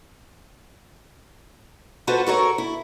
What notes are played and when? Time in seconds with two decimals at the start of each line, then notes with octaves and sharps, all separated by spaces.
2.07 F4 F#4 A4 B4 C5 F#5
2.26 F#4 A4 A#4 C#5
2.58 E4